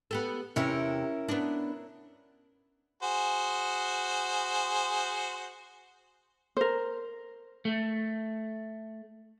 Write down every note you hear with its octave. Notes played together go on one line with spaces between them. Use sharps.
B3 G4 A4
E2 C3 C#4 E4 A#4
B3 D4
F#4 G#4 C5
A#4 C5
A3